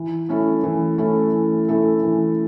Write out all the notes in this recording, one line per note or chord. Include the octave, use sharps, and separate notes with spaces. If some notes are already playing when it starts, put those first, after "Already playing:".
Already playing: E3
A3 C#4 E4 A4
E3
A3 C#4 E4 A4
E3
A3 C#4 E4 A4
E3